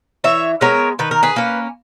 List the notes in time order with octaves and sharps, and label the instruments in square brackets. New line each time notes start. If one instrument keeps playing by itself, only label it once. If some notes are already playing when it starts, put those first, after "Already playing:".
[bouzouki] E3 C#5 E5
G#3 B3 A#4 C#5
D#3 B4
A#4
G#4 B4
A#3 C#4